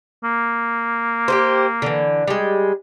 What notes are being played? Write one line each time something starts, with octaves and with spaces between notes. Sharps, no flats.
A#3
G4 G#4 C5
D3 E3
G3 G#3